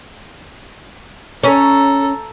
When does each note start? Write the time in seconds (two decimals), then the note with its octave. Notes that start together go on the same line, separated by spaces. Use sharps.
1.44 C#4 A4 A#5